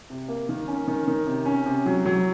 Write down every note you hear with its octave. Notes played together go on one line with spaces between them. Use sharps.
C3
A#3
D#3
C#4
D#3
D#3
C3
C#4
C3
F#3
F#3